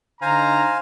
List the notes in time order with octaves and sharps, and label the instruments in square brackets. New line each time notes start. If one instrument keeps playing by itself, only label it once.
[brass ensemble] D3 D#4 A#5 [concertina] C5 F5 G#5